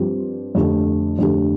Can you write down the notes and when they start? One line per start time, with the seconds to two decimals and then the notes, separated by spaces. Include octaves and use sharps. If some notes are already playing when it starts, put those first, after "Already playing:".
Already playing: G2 F3 C4 G4
0.55 F2 D3 A3 D4 G4
1.19 F2 D3 A3 D4 G4